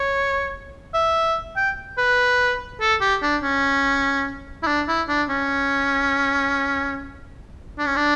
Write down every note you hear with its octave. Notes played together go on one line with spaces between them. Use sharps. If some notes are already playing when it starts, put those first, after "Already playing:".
Already playing: C#5
E5
G5
B4
A4
G4
D4
C#4
E4
D4
E4
D4
C#4
D4
C#4
D4